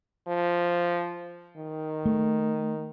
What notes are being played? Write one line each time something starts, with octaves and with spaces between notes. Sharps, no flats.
F3
D#3
A3